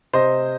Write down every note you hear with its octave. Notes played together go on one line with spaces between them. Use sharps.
C3 C5 D#5